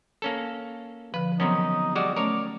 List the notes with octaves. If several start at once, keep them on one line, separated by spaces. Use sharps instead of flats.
A#3 C#4 A4
D3 F3 B4
C3 D#3 F#3 B3 C#4 D#4
G3 G#3 F#4 D5
A3 C#4 A#4 C#5 D5